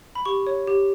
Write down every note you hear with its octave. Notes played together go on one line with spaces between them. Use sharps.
B5
G4 C#6
C#5
G4